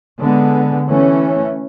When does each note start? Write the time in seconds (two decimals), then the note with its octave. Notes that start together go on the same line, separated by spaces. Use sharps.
0.20 D3 G#3 B3
0.87 E3 A3 C#4